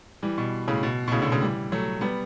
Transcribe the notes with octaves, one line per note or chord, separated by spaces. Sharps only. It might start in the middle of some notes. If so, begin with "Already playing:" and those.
E3 G3
B2
A2 C#3
B2
B2
A2 C#3
B2 D3
A2 C#3
E3 G3
F#3 A3
G3 B3